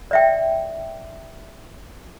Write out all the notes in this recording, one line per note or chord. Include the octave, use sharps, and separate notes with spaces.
D5 E5 G5